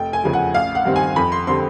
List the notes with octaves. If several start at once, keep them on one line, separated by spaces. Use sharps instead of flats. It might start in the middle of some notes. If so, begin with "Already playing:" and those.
Already playing: F1 G5
G#5
E2 C#3 F3
F#5
A1 F5
F#5
G2 D#3 G3 C4
G#5
F2 B5
C6
D3 G3 C4 C6